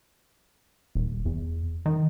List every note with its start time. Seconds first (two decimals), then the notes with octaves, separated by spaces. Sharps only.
0.95 D#1
1.25 E2
1.86 D#3